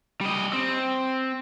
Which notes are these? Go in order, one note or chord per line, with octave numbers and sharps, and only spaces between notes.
G3 D#5
C4